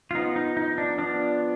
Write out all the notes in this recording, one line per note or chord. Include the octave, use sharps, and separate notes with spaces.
F4
F3 B3 D#4
D#4
D#4
D4
F3 B3 D4